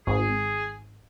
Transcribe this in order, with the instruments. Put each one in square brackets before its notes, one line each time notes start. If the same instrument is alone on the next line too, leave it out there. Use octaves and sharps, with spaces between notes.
[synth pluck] G#1 [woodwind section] G#4